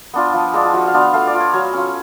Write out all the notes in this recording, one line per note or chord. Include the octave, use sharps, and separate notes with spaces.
B3 D4 F4
F3
G#3 D4 F4
F4
F3 F#4
F5
B3 D4 F4
F#5
A3 F5
D5
F4
C#5
F#3 C#5
C#4 F4